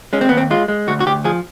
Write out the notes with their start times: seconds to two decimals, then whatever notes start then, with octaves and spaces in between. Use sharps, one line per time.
0.13 G#3 C#4
0.21 C4
0.29 D#2 B3
0.37 C4
0.51 G#3 F4
0.68 G#3
0.87 D2 F#4
1.00 F#4
1.06 D2 G4
1.24 F3 G#4